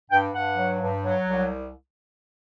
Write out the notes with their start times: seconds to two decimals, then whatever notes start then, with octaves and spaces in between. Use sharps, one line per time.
0.10 G2 G5
0.34 G2 F#5
0.56 F#3
0.81 G2
1.03 F#3
1.26 C2